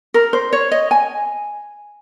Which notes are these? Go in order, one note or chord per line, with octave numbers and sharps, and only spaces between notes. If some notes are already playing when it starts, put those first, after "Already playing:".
A#4
C5
C#5
D#5
G#5